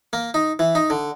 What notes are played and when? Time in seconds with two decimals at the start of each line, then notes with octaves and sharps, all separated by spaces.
0.13 A#3
0.34 D#4
0.59 E3
0.75 D#4
0.90 D3